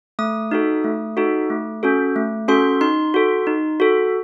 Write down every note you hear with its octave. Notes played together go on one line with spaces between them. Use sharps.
A3 D#6
D#4 F#4 A4
A3
D#4 F#4 A4
A3
C#4 F#4 A4
A3
C#4 F#4 A4 C6
D#4 C6
F#4 A4
D#4
F#4 A4